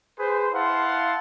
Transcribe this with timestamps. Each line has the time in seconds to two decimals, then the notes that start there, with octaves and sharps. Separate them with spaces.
0.18 G#4 B4 C5
0.53 E4 F5 F#5 A5 C6